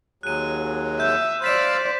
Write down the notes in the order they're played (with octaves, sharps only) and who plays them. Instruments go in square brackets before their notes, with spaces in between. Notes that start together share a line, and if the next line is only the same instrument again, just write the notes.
[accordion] D#2 F#3 G#3 [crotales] F#6 D#7
[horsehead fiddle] E5 [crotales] G6
[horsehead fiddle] C5 D5 [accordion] F5 B5 E6 [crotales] G6 B6 E7